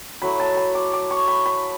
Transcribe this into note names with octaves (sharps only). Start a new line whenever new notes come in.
F#3 A3 E4 B5
A5
B5
D6
D6
C#6
B5
B5